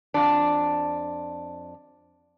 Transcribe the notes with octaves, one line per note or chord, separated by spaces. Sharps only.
F2 D4